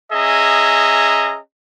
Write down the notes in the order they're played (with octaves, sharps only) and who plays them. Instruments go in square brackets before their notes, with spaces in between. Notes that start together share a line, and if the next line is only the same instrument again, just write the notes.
[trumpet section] C#4 G#4 D#5 E5 A#5